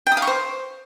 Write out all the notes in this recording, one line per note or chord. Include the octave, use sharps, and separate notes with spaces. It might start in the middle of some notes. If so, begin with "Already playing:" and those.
G5
D#6
F5
C#6
C5